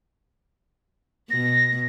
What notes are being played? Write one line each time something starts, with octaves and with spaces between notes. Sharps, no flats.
B2 A#6